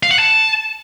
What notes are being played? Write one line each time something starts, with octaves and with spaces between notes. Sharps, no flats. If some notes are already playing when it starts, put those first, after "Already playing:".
F5
F#5
A5